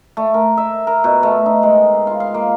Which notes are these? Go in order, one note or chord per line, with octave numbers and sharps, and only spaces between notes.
A3
A#4
E5
A#4
B2
A3
D#4
G#3
F4
F5
A#3